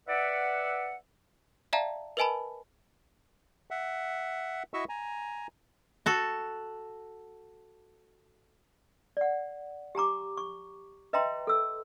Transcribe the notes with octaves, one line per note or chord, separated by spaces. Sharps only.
B4 D5 E5 F#5
D5 E5 F5 G5 A5 A#5
A#4 B4 D#5 G#5 A5 B5
E5 F#5
E4 F#4 D#5 E5 C#6 E6
G#5 A#5
F#4 A4
D5 F#5
G4 G#5 A#5 D6
C#6
B4 D#5 E5 G5 A#5 C6
A4 E6